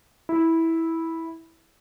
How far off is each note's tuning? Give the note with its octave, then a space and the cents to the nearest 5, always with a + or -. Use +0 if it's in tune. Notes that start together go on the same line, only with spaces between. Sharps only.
E4 -10